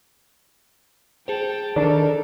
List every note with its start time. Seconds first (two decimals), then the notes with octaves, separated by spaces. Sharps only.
1.28 G#4 C5 G5 A5
1.76 D#3 D4 A4 A#4 D5